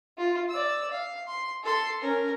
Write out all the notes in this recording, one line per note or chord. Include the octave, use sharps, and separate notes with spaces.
F4
D5 E6
F5
C6
A4 C6
C#4 A#4